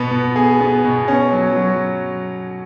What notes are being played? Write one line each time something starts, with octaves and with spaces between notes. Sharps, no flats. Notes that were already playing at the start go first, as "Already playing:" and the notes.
Already playing: B2 B3
B2
G#4
B3
B2
C#4
F#3
F#3